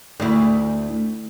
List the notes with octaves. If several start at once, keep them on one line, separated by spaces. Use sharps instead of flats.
D2 E4